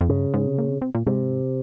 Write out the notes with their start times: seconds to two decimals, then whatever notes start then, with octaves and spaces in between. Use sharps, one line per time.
0.01 F2
0.09 G2 C#3
0.34 G#2
0.47 C3
0.58 A#2
0.70 C3
0.82 C3
0.95 A#2
1.07 G#2 C3